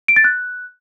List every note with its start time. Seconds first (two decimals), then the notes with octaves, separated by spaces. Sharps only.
0.08 D7
0.16 A6
0.24 F#6